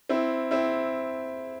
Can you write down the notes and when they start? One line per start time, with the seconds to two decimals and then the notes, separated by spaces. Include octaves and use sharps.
0.09 C4 E4
0.51 C4 E4